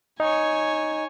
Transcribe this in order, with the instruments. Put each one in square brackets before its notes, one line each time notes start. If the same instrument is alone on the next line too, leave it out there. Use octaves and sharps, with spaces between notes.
[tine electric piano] D#4 [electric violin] C#5 G#5